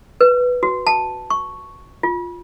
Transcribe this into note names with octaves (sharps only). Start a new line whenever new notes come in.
B4
F#4
A5
C#6
F4